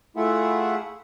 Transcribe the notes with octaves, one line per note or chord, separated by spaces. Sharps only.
A3 E4 F4 G#4 E5 F#5